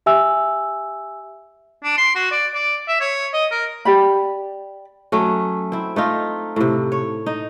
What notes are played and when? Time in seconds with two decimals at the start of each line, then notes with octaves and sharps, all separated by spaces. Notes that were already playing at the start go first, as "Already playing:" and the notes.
0.06 G4 E5 G#5 E6
1.83 D4
1.97 C6
2.15 F#4
2.31 D5
2.54 D5
2.88 E5
3.00 C#5
3.33 D#5
3.51 A#4
3.85 G4 D5 B5
5.12 F#3 A3 C#4
5.72 C4 E4
5.96 A3 D#4 F4
6.56 A2 C3
6.92 C#5
7.26 D#4